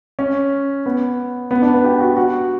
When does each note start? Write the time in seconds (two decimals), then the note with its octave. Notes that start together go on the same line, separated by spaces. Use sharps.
0.19 C#4
0.86 B3
1.51 B3
1.62 D4
1.74 B4
1.84 G4
2.00 F#4
2.17 F#4